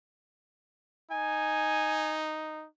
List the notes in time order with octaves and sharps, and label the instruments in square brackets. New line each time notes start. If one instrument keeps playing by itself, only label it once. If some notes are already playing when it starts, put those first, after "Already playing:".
[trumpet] D#4 [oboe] G#5